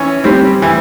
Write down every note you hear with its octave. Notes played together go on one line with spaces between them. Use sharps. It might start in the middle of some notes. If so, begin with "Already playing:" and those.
Already playing: E3 C#4
G3 C4
E3